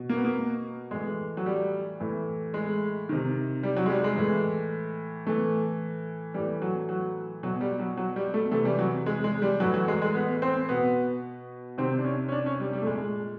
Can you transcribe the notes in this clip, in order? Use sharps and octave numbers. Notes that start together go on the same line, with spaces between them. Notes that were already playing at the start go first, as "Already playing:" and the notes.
Already playing: B2
A#3
B3
A#3
A2 E3 G#3
F#3
G3
A2 E3
G#3
C3 D#3
G3
F#3
G#3
G3
G#3
A2 E3
A2 E3 A3
A2 E3 G3
F#3
F#3
B2 F#3
G3
F#3
F#3
G3
A3
C3 E3 A3
G3
F#3
G#3
G#3
G3
A2 E3 F#3
F#3
G#3
G#3
B3
C4
B2 B3
C3 D#3 C4
D4
C#4
C#4
D4
C#4
G3
G3
A3
A#2 G#3